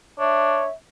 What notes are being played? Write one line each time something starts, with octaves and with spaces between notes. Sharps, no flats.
D4 C#5 E5